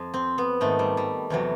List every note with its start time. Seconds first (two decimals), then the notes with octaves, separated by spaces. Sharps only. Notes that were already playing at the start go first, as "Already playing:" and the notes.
Already playing: F2
0.14 C4
0.38 B3
0.61 G#2 D#3 A3
0.79 G3
0.97 G3
1.30 E2 C3 E3 F#3